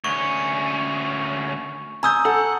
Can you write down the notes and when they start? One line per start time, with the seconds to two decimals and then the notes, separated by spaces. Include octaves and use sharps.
0.04 D2 C#4 C#6
2.03 G#5 A#5 D#6 E6 G6
2.25 A4 F#5